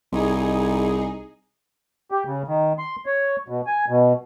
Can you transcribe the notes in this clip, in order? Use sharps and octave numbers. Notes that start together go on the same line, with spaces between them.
C2 D#4 G#4
G4
C#3
D#3
C6
C#5
B2
G#5
B2